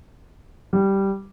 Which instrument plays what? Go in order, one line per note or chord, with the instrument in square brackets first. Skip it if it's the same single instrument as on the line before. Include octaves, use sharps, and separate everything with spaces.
[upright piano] G3